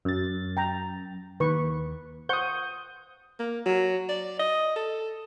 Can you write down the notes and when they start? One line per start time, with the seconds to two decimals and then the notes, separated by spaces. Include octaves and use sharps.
0.05 F#2 A6
0.57 G5 A#5
1.40 D#2 B4 C#6
2.29 C5 F#5 C#6 D#6 G6
3.39 A#3
3.66 F#3
4.09 D5
4.39 D#5
4.76 A4